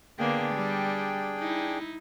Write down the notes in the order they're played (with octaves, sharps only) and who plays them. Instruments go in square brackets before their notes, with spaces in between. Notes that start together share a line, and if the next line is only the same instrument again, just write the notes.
[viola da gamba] D3 A#3 B3 [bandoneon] D4 G#4 G5
[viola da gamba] G3
D#4 E4